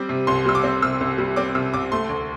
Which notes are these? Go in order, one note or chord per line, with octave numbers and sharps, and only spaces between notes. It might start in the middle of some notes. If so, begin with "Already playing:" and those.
Already playing: G3 C4 D6
C3
C2 C6
G3 E6
D6
C4
C3 E6
C2
G3
C4 D6
C3 E6
C2 D6
A3 C6
D2